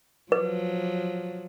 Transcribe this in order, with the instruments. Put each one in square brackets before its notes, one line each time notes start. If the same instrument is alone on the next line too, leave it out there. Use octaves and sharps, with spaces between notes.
[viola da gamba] F3 F#3 [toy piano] B4